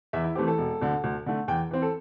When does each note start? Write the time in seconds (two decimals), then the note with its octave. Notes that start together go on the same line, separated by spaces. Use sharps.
0.13 E2 E5
0.24 E4
0.35 E3 A3 C4 G4
0.48 A4
0.58 E1
0.81 D2 D3
1.04 D2
1.26 D3 A3
1.48 E2 G5
1.71 E3 C4
1.82 A4